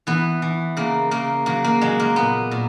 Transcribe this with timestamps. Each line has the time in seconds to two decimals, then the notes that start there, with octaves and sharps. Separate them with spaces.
0.07 E3 B3
0.42 E3
0.77 C#3 A#3
1.11 C#3 A#3
1.46 F#3 A#3
1.64 A#3
1.81 F#3 G#3
2.00 A#3
2.16 A#2 B3
2.51 A#2